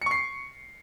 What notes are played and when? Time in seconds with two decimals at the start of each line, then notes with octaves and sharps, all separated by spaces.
0.02 C#7
0.06 C#6
0.11 C7